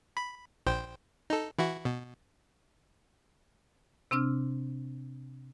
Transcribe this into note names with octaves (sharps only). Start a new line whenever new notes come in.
B5
A#1 C5 G5
D#4 A4
E3 E4 F#4
B2
C3 C4 D4 E6 F6